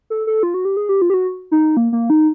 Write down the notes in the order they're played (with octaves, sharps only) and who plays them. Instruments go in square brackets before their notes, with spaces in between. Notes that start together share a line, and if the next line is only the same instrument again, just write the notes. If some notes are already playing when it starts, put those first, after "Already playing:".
[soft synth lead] A4
A4
F4
F#4
G4
G#4
G4
F4
G4
F#4
D#4
A#3
A#3
D#4